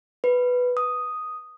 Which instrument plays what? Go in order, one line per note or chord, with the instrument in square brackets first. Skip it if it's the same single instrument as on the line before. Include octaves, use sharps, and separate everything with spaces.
[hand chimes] B4
D#6